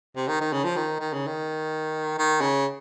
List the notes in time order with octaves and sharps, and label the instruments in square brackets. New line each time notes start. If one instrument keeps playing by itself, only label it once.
[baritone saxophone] C3
D#3
D#3
C#3
F3
D#3
D#3
C#3
D#3
D#3
C#3